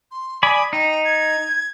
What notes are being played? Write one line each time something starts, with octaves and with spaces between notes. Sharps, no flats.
C6
D5 G#5 B5 D#6
D#4 G5
G#6